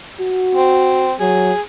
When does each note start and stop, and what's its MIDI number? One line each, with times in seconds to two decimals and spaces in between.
0.20 1.10 66
0.55 1.14 60
1.20 1.52 54
1.20 1.61 68